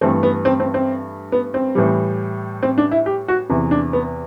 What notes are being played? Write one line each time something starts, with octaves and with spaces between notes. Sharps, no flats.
G2 E3 A3 C4
B3
C4
C4
C4
B3
C4
A2 E3 G3
C4
D4
E4
G4
F#4
E2 C3 E3
D4
B3